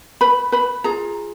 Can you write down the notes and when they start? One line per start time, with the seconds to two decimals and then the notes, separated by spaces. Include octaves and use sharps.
0.21 B4 B5
0.52 B4 B5
0.84 F4 G#4 A#5